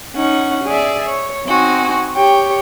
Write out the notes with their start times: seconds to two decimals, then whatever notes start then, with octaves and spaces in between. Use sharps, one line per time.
0.16 C#4 D#4 F#5
0.65 G#4 D5 E5
1.07 C#5
1.46 C4 D#4 F#4 G#5
2.15 G4 C#5 G5